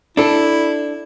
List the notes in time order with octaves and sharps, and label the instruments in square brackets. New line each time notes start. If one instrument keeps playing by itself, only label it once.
[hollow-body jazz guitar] D4 A4 [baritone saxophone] E4